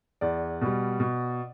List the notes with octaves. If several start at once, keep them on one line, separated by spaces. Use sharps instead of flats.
E2 D5
B2 G3
B2